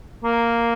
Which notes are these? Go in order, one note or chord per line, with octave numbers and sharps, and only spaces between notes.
A#3